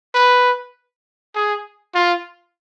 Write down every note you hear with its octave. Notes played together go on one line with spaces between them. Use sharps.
B4
G#4
F4